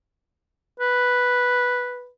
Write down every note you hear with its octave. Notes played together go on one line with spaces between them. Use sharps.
B4